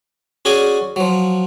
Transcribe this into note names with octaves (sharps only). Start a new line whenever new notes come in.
C#4 F#4 G#4 D5 G#5
F3 F#3